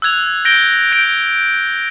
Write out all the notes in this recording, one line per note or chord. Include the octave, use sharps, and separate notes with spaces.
E6 F#6 G#6 F7
G6 A#6 D7 G7
G6 D7